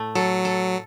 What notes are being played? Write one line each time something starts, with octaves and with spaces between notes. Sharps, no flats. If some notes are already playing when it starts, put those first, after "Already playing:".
Already playing: A2 A3
F#3 A4
A4